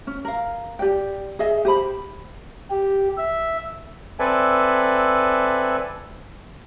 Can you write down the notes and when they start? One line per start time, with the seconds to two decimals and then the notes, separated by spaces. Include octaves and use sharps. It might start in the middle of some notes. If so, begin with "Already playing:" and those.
0.07 C#4
0.25 A#4 F5
0.79 G4 D5 G5
1.39 G#4 D#5 E5
1.65 G4 C5 B5
2.70 G4
3.17 E5
4.19 C4 A4 B4 D5 E5 G#5